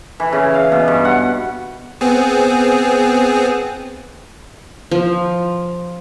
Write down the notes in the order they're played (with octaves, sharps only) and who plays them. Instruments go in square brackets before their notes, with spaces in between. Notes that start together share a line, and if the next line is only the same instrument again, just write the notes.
[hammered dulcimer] E3
C#3
F5
B2
G2
F#5
[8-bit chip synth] B3 C4 G#4
[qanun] F3